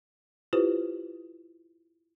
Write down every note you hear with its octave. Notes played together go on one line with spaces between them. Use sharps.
E4 F4 G4 B4 C5